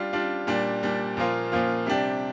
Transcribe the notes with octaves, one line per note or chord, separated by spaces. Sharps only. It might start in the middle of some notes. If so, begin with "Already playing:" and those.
Already playing: G3 D4 F4
G3 D4 F4
A#2 G3 D4
A#2 G3 D4
A#2 F3 A#3 F4
A#2 F3 A#3 F4
C3 G3 D4 G4